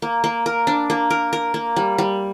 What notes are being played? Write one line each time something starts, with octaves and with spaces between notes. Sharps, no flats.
A#3
A#3
A#4
D4
A#3
A#4
A#4
A#3
G3
G3